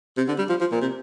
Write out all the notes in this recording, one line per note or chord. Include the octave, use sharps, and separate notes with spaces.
C3
D3
G3
F3
F3
A#2
C3